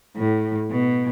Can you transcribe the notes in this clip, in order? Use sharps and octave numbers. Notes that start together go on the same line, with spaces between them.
A2
B2